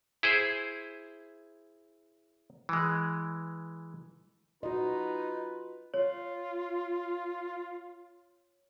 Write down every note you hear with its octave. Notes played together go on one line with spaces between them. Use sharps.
E4 G#4 C5
E3 G#3
D#4 F4 F#4 B4 D#5
F4 C#5